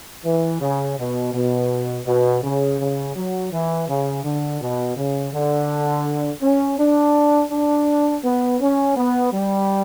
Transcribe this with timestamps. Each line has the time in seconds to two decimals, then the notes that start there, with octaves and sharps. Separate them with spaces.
0.25 E3
0.61 C#3
0.98 B2
1.34 B2
2.07 B2
2.44 C#3
2.80 C#3
3.16 F#3
3.52 E3
3.89 C#3
4.24 D3
4.61 B2
4.97 C#3
5.33 D3
6.42 C#4
6.79 D4
7.51 D4
8.24 B3
8.61 C#4
8.96 B3
9.33 G3